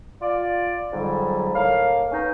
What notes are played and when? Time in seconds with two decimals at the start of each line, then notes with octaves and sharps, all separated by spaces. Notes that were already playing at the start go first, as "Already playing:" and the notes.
0.22 F4 D5
0.93 F2 G#2 D3 F#3 G3
1.55 A2 A#3 F5
2.12 B3 C#4 D#4